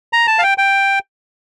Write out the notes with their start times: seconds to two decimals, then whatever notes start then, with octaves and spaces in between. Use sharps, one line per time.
0.13 A#5
0.27 A5
0.39 F5
0.43 G5
0.58 G5